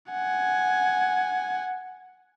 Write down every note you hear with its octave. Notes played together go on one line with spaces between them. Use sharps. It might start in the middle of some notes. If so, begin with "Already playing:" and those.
F#5 G#5